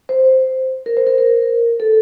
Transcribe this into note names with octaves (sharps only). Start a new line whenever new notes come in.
C5
A#4
C5
A#4
A#4
A4